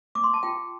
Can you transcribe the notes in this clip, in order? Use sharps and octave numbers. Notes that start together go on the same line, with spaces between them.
D6
C6
A5
F4 G5